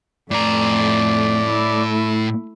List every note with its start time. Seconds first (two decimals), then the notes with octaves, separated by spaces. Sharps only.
0.31 F2 A2 A3 D5 A#5
1.46 A3 E4